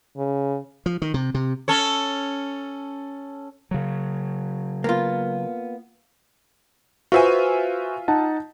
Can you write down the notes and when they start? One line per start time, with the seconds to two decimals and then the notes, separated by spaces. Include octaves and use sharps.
0.17 C#3
0.86 F3
1.02 D#3
1.14 C3
1.34 C3
1.68 C#4 A4 C#5
3.71 C#3 F#3
4.84 A#3 B3 F4
7.12 F4 F#4 B4 C5 E5 G#5
8.08 D#4 F#5 A5